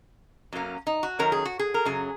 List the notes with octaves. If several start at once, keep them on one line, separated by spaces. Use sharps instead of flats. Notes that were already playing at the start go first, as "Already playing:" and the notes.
F#2 F#3 A#3 C#4
D#4
F#4
F#2 D#3 F#3 C#4 A#4
G#4
F#4
G#4
A#4
F#2 C#3 F#3 G#4